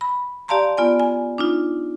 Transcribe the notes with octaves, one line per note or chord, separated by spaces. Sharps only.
B5
G4 D5 F5 A5 A#5 C6
B3 F4 D5 G#5
G#5
D4 D#4 F4